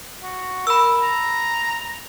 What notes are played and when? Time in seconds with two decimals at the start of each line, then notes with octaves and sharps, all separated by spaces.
0.22 F#4
0.67 A#4 B5 E6
1.02 A#5